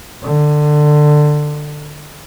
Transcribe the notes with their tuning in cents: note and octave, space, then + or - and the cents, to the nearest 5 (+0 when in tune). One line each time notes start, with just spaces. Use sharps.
D3 +20